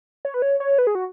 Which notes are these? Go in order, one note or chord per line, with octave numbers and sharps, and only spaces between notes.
C#5
B4
C#5
C#5
B4
G#4
F#4